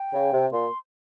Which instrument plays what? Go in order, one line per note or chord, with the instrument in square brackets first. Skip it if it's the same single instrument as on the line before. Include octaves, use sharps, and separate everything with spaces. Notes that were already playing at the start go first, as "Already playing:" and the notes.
Already playing: [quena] G5
[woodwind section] C#3
C3
[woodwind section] A#2 [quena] C6